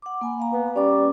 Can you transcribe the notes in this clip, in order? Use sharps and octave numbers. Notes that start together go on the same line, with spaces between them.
F#5 D6
A#3 G#5 B5
F5 A#5
B3
G3 C#4 D6